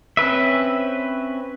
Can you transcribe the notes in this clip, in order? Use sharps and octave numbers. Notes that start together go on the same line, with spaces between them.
C4 C#4 B4 E5